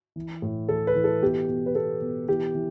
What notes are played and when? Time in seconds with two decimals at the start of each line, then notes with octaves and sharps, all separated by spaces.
0.16 E3
0.42 A2
0.69 E3 A4
0.87 B4
0.95 E3
1.04 A4
1.22 B2 G4
1.49 B2
1.66 B4
1.75 B2 A4
2.01 B2
2.28 E3 G4
2.55 E3